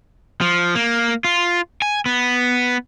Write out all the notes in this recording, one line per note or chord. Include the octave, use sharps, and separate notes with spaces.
F3
A#3
F4
G#5
B3